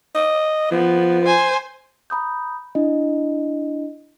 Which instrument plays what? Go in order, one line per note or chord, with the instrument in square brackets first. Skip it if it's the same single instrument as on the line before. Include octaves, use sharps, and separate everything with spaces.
[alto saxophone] D#5
[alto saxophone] F3 [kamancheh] B3
[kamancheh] C5 G#5
[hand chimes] A#5 B5 D#6 G6
D4 E4 D#5